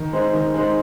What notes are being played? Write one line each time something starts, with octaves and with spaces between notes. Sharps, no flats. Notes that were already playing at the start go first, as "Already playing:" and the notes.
Already playing: D#3
G#3 C4 D#4
D#3
G#3 C4 D#4